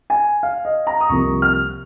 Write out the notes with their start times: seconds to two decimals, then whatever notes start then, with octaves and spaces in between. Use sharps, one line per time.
0.10 G#5
0.43 F5
0.65 D#5
0.87 A#5
1.01 D#6
1.09 C2 C3 F3 A#3 C#6
1.42 F6